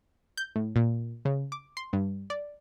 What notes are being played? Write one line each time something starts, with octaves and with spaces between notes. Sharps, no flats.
G6
A2
A#2
C#3
D6
C6
G2
D5